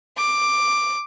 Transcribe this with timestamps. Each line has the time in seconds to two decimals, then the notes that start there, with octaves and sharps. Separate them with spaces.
0.17 D6